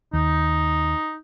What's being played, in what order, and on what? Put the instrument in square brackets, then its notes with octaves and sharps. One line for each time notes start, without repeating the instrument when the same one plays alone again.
[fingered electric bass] D#2 [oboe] D#4